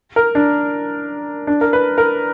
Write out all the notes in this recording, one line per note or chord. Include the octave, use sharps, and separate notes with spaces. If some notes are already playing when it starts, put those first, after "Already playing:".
A#4
D4
D4
A#4
B4
A#4